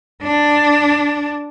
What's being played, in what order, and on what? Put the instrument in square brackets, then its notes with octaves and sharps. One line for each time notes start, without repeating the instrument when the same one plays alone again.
[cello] D4